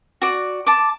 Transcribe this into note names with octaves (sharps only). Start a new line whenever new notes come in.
F#4 D5
A5 D6